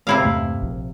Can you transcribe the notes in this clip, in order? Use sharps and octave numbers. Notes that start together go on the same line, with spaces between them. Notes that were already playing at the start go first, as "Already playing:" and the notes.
C3 E4 F5
E2 G2 A3
A#1